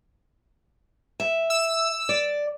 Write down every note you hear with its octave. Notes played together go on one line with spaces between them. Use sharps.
E5
E6
D5